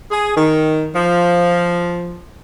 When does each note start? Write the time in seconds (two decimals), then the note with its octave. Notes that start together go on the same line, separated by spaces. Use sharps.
0.11 G#4
0.36 D#3
0.95 F3